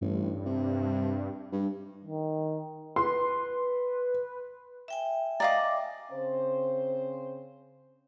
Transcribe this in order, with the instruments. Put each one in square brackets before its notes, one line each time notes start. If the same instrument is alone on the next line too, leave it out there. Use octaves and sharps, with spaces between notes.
[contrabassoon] A1 [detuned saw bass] G2
[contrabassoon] C3
G2
[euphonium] D#3
[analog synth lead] B4 [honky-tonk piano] C6
[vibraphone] E5 G5 G#5
[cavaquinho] D5 D#5 D6 [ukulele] F5 A#5
[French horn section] C#3 C4 C5